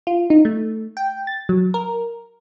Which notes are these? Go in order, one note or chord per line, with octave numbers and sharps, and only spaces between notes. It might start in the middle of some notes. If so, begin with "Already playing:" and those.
F4
D#4
A3
G5
A6
F#3
A#4